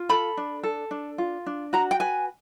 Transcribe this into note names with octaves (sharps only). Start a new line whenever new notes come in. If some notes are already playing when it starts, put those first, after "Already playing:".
Already playing: F4
A4 B5
D4
A4
D4
F4
D4
F#4 A#5
G5
B4 G#5